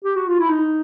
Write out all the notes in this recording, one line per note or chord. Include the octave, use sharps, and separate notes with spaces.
G4
F#4
F4
E4
D#4